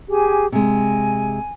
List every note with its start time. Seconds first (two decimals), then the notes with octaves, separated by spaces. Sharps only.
0.09 G4 G#4 G#5
0.52 C3 G#3 G#5